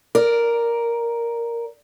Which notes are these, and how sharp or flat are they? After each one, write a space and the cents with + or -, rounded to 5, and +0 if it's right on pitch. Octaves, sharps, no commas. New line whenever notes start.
A#4 +0 D5 +0